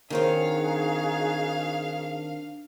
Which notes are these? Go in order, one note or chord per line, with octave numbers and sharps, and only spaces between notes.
D#3 C4 D4 D#4 F#4 G#4 C#5 F5